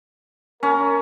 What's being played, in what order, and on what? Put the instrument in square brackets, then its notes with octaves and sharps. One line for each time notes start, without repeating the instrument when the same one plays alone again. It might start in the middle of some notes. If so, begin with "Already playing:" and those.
[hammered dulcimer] C#4 [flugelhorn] A#4